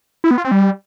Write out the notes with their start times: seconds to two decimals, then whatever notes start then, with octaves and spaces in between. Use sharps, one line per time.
0.24 E4
0.31 B3
0.38 F4
0.45 C4
0.51 G3